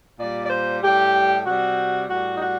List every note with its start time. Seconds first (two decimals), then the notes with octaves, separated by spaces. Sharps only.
0.20 A#2 G3 D5
0.45 D5
0.50 C5
0.82 A2 G3 G4
1.45 C3 G3 F#4
2.09 A2 G3 F#4
2.37 D#4
2.41 F#4